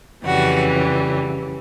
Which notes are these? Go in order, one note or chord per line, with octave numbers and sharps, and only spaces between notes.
F2 C#3 E3 G3 F#4